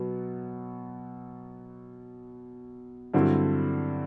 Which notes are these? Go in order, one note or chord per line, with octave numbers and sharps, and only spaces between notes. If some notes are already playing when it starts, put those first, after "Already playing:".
Already playing: B2 F#3 B3
G2 D3 F#3 C4 E4